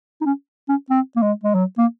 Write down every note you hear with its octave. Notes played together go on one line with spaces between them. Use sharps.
D#4
C#4
C#4
C4
A#3
G#3
G#3
F#3
A#3